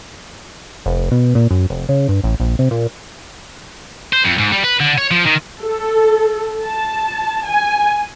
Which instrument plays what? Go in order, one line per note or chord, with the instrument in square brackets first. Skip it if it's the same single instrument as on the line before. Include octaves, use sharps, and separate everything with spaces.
[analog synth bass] F1
B2
A#2
F#2
F1
C#3
G2
A1
A#1
C3
A#2
[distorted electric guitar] C5
F2
G#2
G3
B4
D3
C#5
F3
D#3
[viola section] A4
A5
G#5